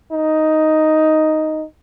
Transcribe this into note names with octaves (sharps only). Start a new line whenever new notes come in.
D#4